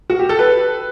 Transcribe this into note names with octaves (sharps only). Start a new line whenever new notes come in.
F#4
G4
A4
B4